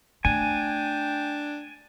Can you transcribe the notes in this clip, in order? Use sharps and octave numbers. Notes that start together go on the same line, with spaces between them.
A3 D4 G5 G#5